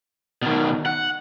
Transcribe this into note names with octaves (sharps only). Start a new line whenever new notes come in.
B2 D#3
F#5